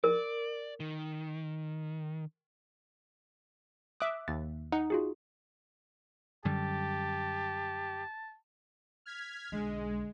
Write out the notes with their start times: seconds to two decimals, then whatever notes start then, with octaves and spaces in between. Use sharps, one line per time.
0.04 A#4 D5
0.80 D#3
4.00 E5 D6 D#6 F#6
4.28 D#2 A6
4.72 D#4 F#5
4.90 F4 F#4 G#4
6.45 F#2 D3 G3 G4 A5
9.06 F6 G#6 B6
9.52 B1 D3 G#3